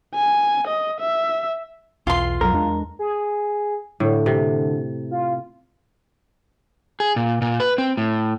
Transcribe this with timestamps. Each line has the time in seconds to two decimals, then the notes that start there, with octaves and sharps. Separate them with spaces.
0.15 G#5
0.67 D#5
1.00 E5
2.07 B1 E2 F4 C6
2.41 B1 F2 F#3 A#4
2.54 E2 G#3 D4
2.99 G#4
4.00 A2 D3
4.26 C3
5.11 F4
7.00 G#4
7.16 A#2
7.42 A#2
7.60 B4
7.78 C4
7.97 A2